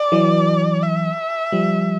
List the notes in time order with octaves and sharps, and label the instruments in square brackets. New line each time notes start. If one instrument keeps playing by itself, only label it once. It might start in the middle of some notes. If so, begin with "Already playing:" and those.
Already playing: [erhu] D5
[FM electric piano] E3 F#3
[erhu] E5
[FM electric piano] F3 G3